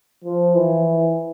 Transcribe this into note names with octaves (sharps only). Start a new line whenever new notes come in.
F3
E3